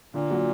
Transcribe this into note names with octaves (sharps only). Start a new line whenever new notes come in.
A#2 D3
F#3 A#3 F#4